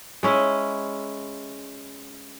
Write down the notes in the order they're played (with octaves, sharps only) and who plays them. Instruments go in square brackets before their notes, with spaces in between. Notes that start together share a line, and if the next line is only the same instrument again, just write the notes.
[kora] G#3 C#4 E4